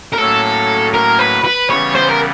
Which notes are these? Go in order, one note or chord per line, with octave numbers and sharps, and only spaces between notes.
A#4
A2 F#3 A#3 C#4 A4
A#4
B4
B4
C#3 E3 G3 B3 C#5
C5
A#4